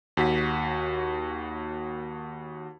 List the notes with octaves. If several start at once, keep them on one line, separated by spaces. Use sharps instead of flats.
D#2 F#4 B6